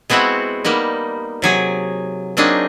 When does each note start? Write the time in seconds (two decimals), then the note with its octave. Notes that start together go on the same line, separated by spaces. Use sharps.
0.10 G#3 B3 C4 E4 F#4
0.65 G3 A#3 B3 D#4
1.42 C3 F#3 G#4
2.37 F#3 A#3 C4 D4 D#4 G#4